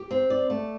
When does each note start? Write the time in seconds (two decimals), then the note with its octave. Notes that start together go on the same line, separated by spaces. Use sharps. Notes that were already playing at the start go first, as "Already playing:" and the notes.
Already playing: G4
0.11 C4
0.30 D5
0.50 A3